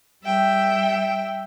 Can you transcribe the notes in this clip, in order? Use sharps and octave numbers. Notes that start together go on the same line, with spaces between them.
G3 E5 G5